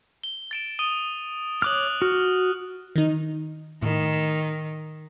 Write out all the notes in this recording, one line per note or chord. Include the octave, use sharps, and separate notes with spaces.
G7
A6 D7 E7
D#6 D#7 G7
C#5 D6 D#6 F6 F#6 F#7
F#4 F6
D#3 D#4
A2 D#3